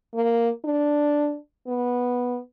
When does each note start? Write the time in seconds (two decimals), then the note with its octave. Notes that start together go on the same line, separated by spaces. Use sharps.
0.14 A#3
0.65 D4
1.67 B3